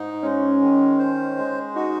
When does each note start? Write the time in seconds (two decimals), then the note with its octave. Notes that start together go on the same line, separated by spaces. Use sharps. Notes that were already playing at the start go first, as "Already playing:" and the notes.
Already playing: G#2 D#4
0.23 G#3 C#4
0.61 D#3
0.99 C5
1.37 G#3
1.75 D#4 F#4